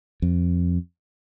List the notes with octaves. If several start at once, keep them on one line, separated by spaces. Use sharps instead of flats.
F2